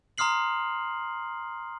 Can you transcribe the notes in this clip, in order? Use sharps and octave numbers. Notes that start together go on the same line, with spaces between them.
A#5 C6 D#6 F6 C7 F#7